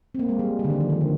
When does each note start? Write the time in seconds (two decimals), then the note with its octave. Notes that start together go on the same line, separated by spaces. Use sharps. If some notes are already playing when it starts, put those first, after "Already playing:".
0.15 C4
0.19 A#3
0.29 G#3
0.39 G3
0.59 G3
0.65 D3
0.70 D#3
0.81 F3
0.90 D#3
1.01 D3